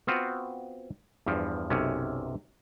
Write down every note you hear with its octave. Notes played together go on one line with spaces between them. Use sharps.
B3 C4 F4 F#4
E2 G2 F3
B1 F#2 C3 C#4